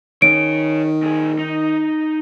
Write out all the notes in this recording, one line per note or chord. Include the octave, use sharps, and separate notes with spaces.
D#3 G#4 C#5 D7
A#2 G#4
D#4